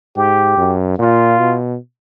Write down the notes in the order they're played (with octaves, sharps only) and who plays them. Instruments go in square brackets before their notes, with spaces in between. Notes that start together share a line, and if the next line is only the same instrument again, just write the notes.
[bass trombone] G#2 [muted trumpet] G4
[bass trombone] F#2
[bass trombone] A#2 [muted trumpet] F4
[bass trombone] B2